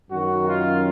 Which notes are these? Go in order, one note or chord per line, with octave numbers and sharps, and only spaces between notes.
F#2 D#3 F#4
F4